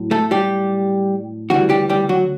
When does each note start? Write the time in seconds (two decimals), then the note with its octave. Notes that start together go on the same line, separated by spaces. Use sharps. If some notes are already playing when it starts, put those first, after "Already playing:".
Already playing: A2 F#3
0.11 A3 A4
0.31 G3 G4
1.50 D2 C#3 E3 F#3 G3 F#4
1.70 G3 G4
1.90 G3 G4
2.09 F#3 F#4